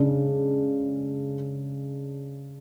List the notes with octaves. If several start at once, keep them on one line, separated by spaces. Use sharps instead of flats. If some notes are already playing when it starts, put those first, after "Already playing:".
Already playing: C#3 G#3 D4